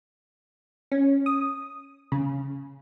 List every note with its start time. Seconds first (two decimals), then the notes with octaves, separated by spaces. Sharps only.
0.91 C#4
1.26 D#6
2.12 C#3